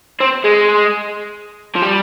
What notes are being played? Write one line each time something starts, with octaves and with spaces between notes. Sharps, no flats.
C4
G#3
F3
G3